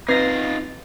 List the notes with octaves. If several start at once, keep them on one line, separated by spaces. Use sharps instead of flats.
C4 D#4 F4 B4 A#6 C7